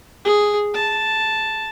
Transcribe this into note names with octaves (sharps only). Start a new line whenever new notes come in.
G#4
A5